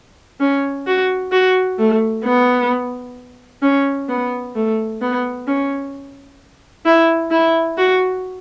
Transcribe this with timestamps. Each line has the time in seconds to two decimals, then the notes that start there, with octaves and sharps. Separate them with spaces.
0.40 C#4
0.87 F#4
1.32 F#4
1.79 A3
2.25 B3
3.62 C#4
4.09 B3
4.55 A3
5.01 B3
5.47 C#4
6.86 E4
7.31 E4
7.78 F#4